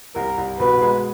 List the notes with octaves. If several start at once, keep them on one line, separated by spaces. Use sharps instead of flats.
C2 A#4
C2
B2 B4
G#3